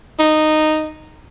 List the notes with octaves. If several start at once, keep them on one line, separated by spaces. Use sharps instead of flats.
D#4